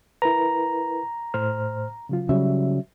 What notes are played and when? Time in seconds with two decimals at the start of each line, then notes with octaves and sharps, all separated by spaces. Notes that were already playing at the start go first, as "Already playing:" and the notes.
0.22 E4 A#4 B4 A#5
1.34 A2 C5 F6
2.09 C#3 F#3 F4
2.29 C#3 F#3 G3 E5